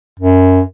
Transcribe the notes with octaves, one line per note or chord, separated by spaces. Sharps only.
F#2